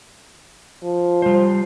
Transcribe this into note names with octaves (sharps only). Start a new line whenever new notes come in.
F3
G3 C5